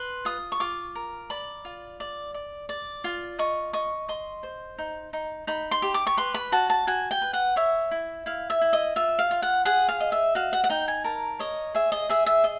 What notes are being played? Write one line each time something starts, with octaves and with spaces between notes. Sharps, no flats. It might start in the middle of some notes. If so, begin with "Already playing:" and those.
Already playing: B4 C6
F4 D#6
C#6
F4 D6
A#4
D5 B5
F4
D5
D5
D5
F4
D#5 C#6
D#5 C#6
D#5 C6
C5
D#4
D#4
D#4 B5
C6
G4
D6
C#6
B4 C6
B5
F#4 A5
A5
F#4 G#5
G5
B4
F#5
C#5 E5
E4
E4 F5
E5
E4
D#5
F4 E5
F5
F4
F#5
G#4 F#5
F5
D#5
E5
F#4 F5
F#5
F#5
D#4 G5
G#5
A#4 A5
C#5 D#5
G#4 E5
D#5
G#4 E5
E5
D#5